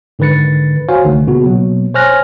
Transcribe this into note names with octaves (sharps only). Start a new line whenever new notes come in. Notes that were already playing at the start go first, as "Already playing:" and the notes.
G#2 D3 D#3 B4 A6 C#7
F#4 C5 C#5 F5 G#5
C2 D3 D#3 A3
A#2 C#3 B3 F#4
B2 F#3 A#3
C5 C#5 G#5 F6 F#6 A#6